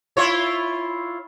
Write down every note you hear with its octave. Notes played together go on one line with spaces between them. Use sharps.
E4 F4 C#5